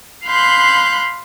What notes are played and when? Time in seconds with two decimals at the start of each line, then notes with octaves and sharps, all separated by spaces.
0.25 F5 B5 C6 F#6 G6